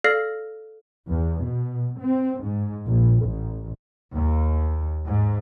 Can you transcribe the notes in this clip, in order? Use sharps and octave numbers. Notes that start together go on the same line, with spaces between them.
A4 D5 F5 F6 A#6 C7
E2
B2
C4
G#2
A#1
A1
D#2
G#2